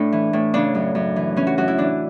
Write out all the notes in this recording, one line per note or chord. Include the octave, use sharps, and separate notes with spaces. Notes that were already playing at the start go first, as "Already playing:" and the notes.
Already playing: A2 D4
E3
A2
C#3 D4
F#2
F#2
E3
E3 C#4
F#4
F#2 F#4
E4
E3 D4